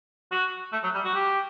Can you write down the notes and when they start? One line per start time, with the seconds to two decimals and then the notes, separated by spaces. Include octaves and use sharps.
0.32 F#4
0.72 A3
0.84 F#3
0.94 G3
1.05 F#4
1.15 G4